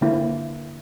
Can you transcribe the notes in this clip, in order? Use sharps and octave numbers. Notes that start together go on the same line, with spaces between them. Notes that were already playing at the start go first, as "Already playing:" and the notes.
D3 A#3 E4